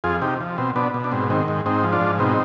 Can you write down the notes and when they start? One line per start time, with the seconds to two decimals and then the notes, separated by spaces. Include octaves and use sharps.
0.04 F2 F4 G#4
0.21 C3 D#4 G4
0.40 F3
0.58 B2 C4
0.76 B2 B3 D4
0.94 B2
1.04 D4
1.12 G#2 C4
1.30 D#3 C4
1.48 G#2
1.66 G#2 C4 D#4
1.83 F3
1.92 D4 F4
2.01 G#2
2.19 B2 C4 D#4